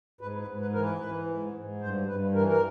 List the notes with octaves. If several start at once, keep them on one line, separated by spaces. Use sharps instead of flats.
G#2 B4
B4
G#2
B4
E3 A#4
B4
E3
G#2
G#2
G2 C5
G2 B4
E3 A#4
A#4